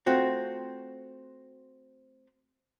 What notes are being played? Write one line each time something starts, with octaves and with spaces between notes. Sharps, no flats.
A3 C4 F4 F#4